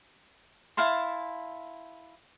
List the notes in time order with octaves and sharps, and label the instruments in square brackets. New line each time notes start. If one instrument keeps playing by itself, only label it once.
[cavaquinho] E4 F5 A5 C6